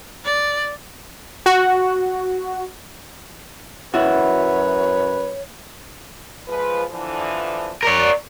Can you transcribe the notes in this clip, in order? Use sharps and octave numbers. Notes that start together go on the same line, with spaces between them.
D5
F#4
F#2 E4 F#4 B4 C#5
F3 G#3 B4
D3 E3 F3
A#4 C#5 D5